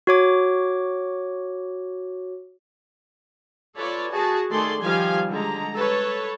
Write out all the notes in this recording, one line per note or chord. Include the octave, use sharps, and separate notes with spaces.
F#4 C#5 D6
F4 A4 B4 C#5 D5
F#4 G#4 A5
D#3 A3 G#4 A4 D5 C6
D#3 F3 G3 F4 F5 G#5
D3 G#3 A#5
A4 B4 C#5